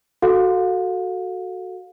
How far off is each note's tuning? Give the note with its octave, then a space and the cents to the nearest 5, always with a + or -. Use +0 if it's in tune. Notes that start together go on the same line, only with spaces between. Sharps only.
F#4 +0 A4 +0 F5 +35